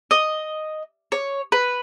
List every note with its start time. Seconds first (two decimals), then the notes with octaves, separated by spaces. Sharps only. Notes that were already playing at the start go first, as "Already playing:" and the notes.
0.11 D#5
1.12 C#5
1.52 B4